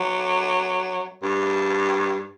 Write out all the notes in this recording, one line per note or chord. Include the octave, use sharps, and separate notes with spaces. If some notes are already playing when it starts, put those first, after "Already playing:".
Already playing: F#3
G2